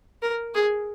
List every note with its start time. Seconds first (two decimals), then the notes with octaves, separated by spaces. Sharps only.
0.22 A#4
0.54 G#4